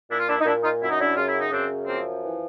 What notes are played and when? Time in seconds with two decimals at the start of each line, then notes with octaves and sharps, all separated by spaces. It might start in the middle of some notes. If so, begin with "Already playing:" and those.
0.10 A#2 D4 E4
0.18 F4
0.28 D4 E4
0.40 D#4
0.45 A#2 D4 E4
0.63 D#4 F4
0.81 F#2 E4
0.90 D#4
1.00 D4 E4
1.15 C#3 F4
1.28 E4
1.39 D#4
1.51 F#2 C4 D4
1.86 F3 A#3 C4
2.23 E3